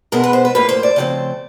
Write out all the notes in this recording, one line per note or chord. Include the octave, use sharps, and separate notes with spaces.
B2 G#3 B3 A#4
B4
C5
B4
A2 F3 A#3 B4
C5
D5
C#3 F3 A3 C4